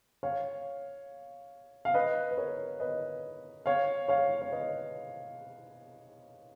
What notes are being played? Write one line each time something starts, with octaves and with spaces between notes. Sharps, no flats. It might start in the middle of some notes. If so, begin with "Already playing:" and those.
C#5 F5
F5
B4 D#5
B4
A#4 C#5
B4 D#5
C#5 F5
C#5 F5
C#5
B4 D#5